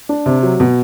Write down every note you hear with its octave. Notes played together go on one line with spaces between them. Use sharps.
D4
C3
F#3
B2